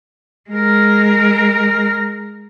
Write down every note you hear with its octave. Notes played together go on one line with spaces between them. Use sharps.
G#3 A#4